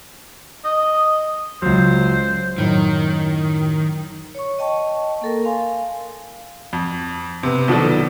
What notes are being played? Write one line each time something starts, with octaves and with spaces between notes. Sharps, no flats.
D#5
C#2 F#3 C5
F#2 A2 D#3 F#3
C#5 C#6
D#5 G5 A5 C#6
A#3 A4 A#4
F5 G#5 C6
F2
C3 B3
B1 D#3 F3 B3 D4 A4